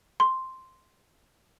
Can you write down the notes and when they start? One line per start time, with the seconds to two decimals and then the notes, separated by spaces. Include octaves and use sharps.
0.20 C6